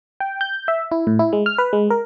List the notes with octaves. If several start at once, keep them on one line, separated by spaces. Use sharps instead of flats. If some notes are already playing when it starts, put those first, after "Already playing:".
G5
G6
E5
E4
A2
E4
G#3
F6
B4
G#3
A#4